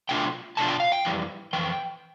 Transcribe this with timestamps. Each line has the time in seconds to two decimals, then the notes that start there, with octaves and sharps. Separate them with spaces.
0.09 B2 A3 D4 F4 G5
0.57 B2 A3 D4 F4 A5
0.68 G5
0.80 F5
0.92 G5
1.05 F2 E3 G3
1.53 F2 E3 G5